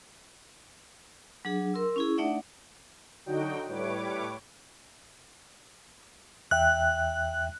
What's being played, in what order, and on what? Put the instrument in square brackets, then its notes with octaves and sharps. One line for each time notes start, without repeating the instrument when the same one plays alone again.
[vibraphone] F#3 D4 G#4
A#4 C6 E6
C#4 E4 G#4
A3 D4 D#4 D5 E5 F#5
[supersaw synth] D3 F#3 D#4 F#4 G5
A2 G3 B4 C#5 D6
[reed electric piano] E2 E5 G5 [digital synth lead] F#6